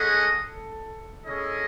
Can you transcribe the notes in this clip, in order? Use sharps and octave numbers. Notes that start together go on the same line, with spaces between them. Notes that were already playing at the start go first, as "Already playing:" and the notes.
Already playing: G#3 C#4 G#4 A4 D#5 F#5
C#4 E4 G#4 D#5